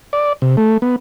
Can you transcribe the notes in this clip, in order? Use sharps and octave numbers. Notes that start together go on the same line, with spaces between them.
D5
C3
A3
B3